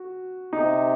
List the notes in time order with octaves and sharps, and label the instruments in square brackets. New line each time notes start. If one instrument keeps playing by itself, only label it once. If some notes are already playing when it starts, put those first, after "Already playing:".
Already playing: [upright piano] F#4
[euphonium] C3 [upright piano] D#4